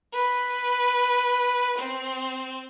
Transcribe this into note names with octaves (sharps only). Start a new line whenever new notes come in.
B4
C4